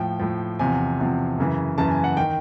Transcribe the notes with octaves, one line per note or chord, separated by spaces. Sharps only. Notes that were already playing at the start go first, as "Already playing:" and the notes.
Already playing: A2 F3 G5
A2 F3
E2 C3 F3 G#5
E2 C3 F3
F#2 C#3 E3
F#2 C#3 E3 A5
G#5
F#5
D#3 G5